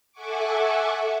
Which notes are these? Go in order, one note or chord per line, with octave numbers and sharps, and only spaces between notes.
A4 E5 F#5 G#5 C#6 D6